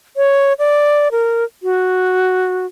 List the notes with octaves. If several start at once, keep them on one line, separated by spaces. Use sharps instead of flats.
C#5
D5
A#4
F#4